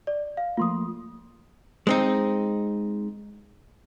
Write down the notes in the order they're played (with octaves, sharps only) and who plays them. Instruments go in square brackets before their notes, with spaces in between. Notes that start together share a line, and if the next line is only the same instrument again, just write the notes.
[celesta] D5
F5
[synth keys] F3 A3 A#3 [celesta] F4 C6 D#6
[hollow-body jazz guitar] G#3 C4 D#4